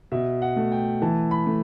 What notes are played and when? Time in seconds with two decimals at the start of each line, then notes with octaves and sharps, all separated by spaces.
0.12 B2 E5
0.42 F#5
0.56 A3
0.72 G5
1.02 E3 A5
1.31 B5
1.46 A3